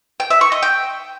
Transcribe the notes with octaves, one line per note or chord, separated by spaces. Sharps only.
G5
E5
C#6
D#5
G5